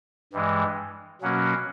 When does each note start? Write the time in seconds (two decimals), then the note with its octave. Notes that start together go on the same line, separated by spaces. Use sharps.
0.32 G2 E3 G#3
1.22 B2 F#3 A#3 C#4 F#4